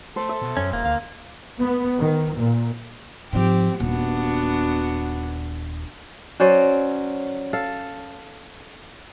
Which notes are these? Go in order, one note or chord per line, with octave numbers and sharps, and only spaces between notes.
A3 A4 C5
E5
B2
F#2 C#4
E1 A#3
D2 F5
B3
D#3
A#2
G#2 F3 C4 G4
D#1 B3 D4 F#4
F#3 C#4 C5 D5
A4 F5